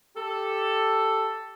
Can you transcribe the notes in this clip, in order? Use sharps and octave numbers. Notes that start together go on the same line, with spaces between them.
G4 A4